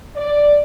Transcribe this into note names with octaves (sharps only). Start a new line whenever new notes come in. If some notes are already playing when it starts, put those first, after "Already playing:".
D5